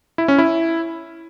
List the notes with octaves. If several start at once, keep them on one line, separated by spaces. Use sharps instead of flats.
E4
C#4
E4